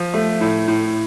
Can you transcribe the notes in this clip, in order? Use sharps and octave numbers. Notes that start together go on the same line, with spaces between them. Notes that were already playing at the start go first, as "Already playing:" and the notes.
Already playing: F3
A3
A2
A2